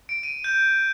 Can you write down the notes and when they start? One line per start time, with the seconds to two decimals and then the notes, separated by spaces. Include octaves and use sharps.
0.09 D7
0.23 D#7
0.44 G6